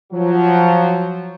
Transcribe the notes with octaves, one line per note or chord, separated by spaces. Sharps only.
F3 F#3